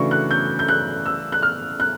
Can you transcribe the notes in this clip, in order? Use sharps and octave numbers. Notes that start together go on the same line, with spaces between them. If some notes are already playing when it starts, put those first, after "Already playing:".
Already playing: C#3 E3 A3 D4 F#4 C#6
F#6
G6
G6
F#6
E6
F#6
F6
F#6